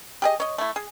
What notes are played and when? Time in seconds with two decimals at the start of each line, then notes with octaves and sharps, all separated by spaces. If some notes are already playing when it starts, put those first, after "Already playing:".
0.22 G4 G#4 D#5
0.40 C#5 D#5
0.58 A3 E4
0.76 G#4